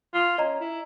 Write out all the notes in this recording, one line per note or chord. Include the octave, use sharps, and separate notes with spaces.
F4
C#4 D#5 A#5
E4